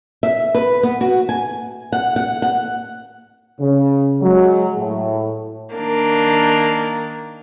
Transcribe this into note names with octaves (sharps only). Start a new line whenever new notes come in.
E5
B4
B3
F#4
G#5
F#5
F#5
F#5
C#3
F#3 G#3
A2
D#3 A#3 D4